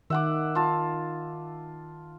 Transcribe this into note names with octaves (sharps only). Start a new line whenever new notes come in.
D#3 E5 F#5 D6
F4 A5